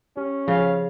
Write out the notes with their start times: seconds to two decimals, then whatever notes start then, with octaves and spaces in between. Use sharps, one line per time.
0.17 C#4 G4
0.48 C#3 F3 G#4 C#5 F5